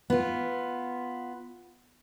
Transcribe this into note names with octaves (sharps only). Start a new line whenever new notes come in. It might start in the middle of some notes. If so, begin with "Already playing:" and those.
B3 F4